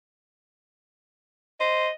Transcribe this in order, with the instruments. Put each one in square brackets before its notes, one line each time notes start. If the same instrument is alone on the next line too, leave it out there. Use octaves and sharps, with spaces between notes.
[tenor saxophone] C5 [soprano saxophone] D#5